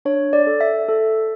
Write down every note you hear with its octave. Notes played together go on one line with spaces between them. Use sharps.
D4 C#5
D5
A4
E5
A4